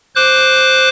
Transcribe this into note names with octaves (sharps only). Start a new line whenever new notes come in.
C5 D6 F#6